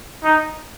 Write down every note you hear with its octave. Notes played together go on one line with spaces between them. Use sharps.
D#4